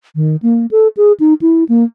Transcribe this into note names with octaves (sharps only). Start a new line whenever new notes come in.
D#3
A#3
A4
G#4
D#4
E4
A#3